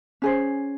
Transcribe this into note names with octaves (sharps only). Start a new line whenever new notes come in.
C#4 G#4 C5